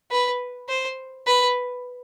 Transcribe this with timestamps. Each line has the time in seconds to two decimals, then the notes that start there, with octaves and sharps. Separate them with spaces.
0.11 B4
0.69 C5
1.27 B4